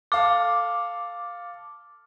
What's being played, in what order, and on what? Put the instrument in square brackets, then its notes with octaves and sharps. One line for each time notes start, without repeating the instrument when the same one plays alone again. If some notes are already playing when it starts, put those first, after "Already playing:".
[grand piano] A4 F5 [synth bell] D6